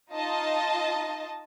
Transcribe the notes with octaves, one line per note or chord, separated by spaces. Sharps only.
D#4 F4 D#5 A5